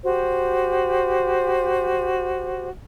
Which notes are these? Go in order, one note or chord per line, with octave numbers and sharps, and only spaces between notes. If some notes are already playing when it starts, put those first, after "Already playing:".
F#4 G4 C5